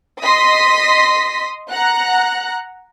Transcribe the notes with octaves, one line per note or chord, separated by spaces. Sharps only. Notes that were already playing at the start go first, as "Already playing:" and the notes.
D#5 C6 D#6 A#6 B6
F#5 A#5 F#6